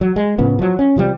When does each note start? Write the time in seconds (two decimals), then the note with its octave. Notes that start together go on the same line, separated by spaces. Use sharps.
0.01 F#3
0.16 G#3
0.38 A2 C#3 F3 B3
0.59 F3 F#3
0.79 C#4
0.96 C3 F3 G3